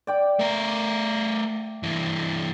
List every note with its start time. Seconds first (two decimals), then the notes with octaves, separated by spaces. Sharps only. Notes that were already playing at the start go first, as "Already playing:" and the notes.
0.07 D5 G5 D6
0.39 A3 A#4 E5
1.83 G2 E3